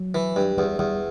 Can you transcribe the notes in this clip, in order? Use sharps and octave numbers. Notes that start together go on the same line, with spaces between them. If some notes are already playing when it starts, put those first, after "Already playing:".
Already playing: F#3
E3
G2
E2 G3
E2 G3